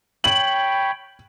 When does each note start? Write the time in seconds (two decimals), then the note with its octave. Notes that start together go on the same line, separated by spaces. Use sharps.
0.24 C#5 G5 B5 F#7